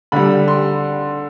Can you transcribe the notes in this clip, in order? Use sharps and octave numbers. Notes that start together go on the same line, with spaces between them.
D3 G3 B5
C6